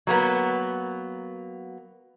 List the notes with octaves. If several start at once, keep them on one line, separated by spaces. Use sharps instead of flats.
F#3 A#3 B3